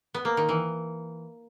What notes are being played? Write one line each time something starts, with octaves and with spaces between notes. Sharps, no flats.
B3
A#3
D#3
E3